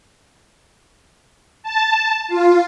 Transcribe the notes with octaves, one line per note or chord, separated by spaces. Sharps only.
A5
F4